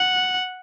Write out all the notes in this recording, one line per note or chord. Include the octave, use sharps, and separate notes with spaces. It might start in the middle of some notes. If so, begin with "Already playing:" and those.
Already playing: F#5